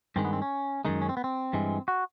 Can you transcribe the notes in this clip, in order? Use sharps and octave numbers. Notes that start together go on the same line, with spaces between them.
G2 D#3 G#3 C4
B3
C4
C#4
F#2 D#3 G#3 D#4
C#4
C4
B3
C4
G2 E3 G#3
F#4